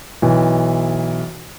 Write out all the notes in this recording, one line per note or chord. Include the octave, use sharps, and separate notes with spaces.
B1 E3